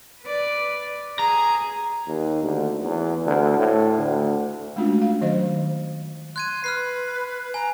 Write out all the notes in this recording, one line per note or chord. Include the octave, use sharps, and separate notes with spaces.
B4 D5
G#4 A#5
D#2
D2
E2
D2
A2
D2
G#3 A3 C#4 D4 F4 F#4
F5
D#3 F#3 C5 D#5
C6 F#6 G#6 D#7
B4 F6 F#6 C7
G#5 A#5